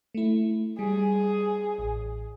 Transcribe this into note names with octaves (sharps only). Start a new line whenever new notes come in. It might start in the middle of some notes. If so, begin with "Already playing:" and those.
A3 E4
G3 G#4
A1